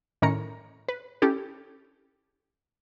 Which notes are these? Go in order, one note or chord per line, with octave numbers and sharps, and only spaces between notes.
A2 D#3 C#4 A#4 A#5 C#7
B4
C#4 E4 G4 A4